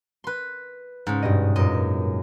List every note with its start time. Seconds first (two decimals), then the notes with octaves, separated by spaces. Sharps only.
0.24 B4 C6
1.07 G#2 C#3
1.22 G2 B2 D#5
1.56 F#2 A#2 D#5